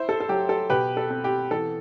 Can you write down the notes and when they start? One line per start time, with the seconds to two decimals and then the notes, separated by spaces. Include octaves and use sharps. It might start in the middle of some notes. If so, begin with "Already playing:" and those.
Already playing: E4 C5 E5
0.09 A4
0.20 A4
0.29 F#3 G4
0.49 A4
0.70 B2 G4 B4
0.97 A4
1.10 C4
1.24 G4
1.51 E3 A4